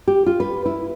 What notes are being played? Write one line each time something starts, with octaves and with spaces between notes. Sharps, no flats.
G4
F4
B4
E4